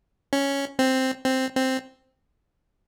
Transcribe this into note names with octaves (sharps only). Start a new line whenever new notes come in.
C#4
C4
C4
C4